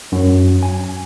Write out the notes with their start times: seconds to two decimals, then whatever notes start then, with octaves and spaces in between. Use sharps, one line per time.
0.12 F#2
0.63 G#5